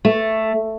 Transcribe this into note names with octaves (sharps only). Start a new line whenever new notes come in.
A3